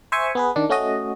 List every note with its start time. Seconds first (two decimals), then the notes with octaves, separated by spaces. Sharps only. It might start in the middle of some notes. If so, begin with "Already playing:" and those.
0.12 C5 E5 G#5 C#6
0.35 B3 G#4 B4
0.56 D#3 D4
0.69 A3 C#4 F#4 D#5